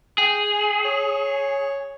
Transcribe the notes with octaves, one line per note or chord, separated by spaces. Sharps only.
G#4 G5
C#5